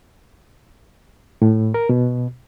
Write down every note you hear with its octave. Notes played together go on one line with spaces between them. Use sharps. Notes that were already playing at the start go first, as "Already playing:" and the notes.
A2
A#4
B2